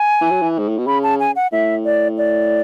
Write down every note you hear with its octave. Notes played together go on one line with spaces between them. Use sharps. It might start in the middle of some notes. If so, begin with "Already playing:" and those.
Already playing: G#5
E3
F#3
E3
G#2
A2
B2
C#3 B5
A5
G#5
F#5
A2 E5
D5
D5